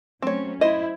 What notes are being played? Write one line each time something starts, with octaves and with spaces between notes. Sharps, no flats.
F#3 A3 C4 C#4 C#5
E4 C5 D#5